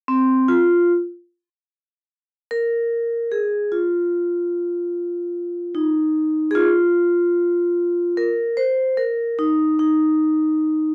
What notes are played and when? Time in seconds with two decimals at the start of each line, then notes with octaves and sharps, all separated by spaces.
0.08 C4
0.48 F4
2.51 A#4
3.32 G#4
3.72 F4
5.75 D#4
6.51 G#4
6.55 F4
8.17 A#4
8.57 C5
8.97 A#4
9.39 D#4
9.79 D#4